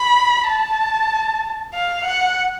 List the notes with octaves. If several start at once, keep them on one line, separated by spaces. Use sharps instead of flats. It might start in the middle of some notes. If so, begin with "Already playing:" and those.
Already playing: B5
A5
F5
F#5